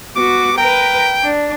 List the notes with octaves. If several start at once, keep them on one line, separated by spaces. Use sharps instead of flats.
B3 F#4 D6
A#4 B4 G5
D4